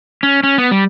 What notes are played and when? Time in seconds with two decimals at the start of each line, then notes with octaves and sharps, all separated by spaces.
0.23 C#4
0.43 C#4
0.58 B3
0.71 G3